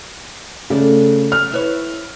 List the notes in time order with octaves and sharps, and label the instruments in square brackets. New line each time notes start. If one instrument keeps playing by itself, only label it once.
[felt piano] C#3 [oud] A3 D4
[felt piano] F6
[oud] E4 B4 C#5